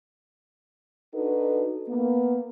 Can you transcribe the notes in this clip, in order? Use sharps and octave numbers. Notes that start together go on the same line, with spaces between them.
D4 D#4 F#4 A4 B4
A#3 B3